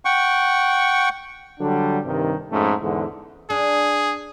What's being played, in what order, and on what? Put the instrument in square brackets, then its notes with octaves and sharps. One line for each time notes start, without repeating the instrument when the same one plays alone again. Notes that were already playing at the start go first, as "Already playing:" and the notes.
[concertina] F#5 G5 C#6
[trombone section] D3 F#3 G3 D4
G2 C3 D#3
F2 G#2 A3 C#4
E2 G#2 D3
[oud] D4 [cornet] G#4